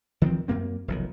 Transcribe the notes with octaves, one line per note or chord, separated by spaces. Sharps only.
D#3 F3 A3 C4
F#2 A#3 C4
F1 B1 D#3